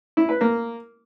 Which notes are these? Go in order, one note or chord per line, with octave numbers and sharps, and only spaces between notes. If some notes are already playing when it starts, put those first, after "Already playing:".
E4
B4
A#3